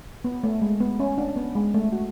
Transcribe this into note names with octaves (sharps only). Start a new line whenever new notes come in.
B3
A3
G#3
B3
C#4
D4
B3
G#3
A3
F#4